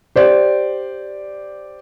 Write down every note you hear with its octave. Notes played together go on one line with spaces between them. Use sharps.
G4 C5 D5